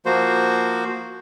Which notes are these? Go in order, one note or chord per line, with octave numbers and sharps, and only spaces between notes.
F3 A#3 F#4 C5